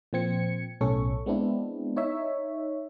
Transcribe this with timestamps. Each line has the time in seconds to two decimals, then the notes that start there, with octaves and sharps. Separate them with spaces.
0.13 A#2 F3 C4 G#6 C#7
0.81 B1 A2 C#4 A4 C#6
1.26 G#3 B3 C4 D4 E4
1.96 D#4 C#5 E5